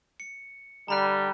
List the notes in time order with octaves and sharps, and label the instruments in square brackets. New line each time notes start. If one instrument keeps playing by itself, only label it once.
[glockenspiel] C#7
[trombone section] D3 G3 [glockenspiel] A#5 B5 F#6